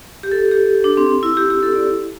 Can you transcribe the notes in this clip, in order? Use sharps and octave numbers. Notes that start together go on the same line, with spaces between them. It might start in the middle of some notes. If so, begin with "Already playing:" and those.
G4
A4
G4
D4
C4
E4
G4
G4
A4
D5